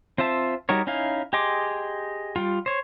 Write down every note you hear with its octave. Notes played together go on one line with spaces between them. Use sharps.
C4 F4 C5 E5 A5
G3 D#4 F#4 A#4 C#5
C#4 D#4 E4 F5
G4 G#4 D#5 C6 D6
G3 F4
C5 C#5